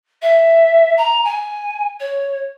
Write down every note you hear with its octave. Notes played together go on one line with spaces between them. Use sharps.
E5
A#5
G#5
C#5